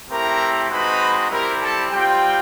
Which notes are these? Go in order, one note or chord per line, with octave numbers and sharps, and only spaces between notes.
A3 C4 E4 G4 A#4 A#5
G#3 C4 D#4 F#4 B4 B5
G3 C4 E4 G4 A#4 A#5
A4 A5
G3 C4 F4 G4 G5